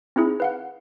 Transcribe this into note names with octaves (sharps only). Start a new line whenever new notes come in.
C4 D#4 E4 G#4
B4 F5 F#5